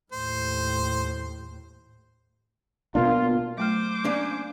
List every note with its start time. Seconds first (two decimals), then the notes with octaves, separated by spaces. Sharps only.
0.12 D#2 A2 C5
2.95 B2 A#3 D4 F4
3.58 F#3 A3 C5 D6 F6
4.04 A#3 C#4 D4